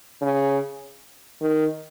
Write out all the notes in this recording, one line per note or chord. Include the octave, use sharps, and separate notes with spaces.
C#3
D#3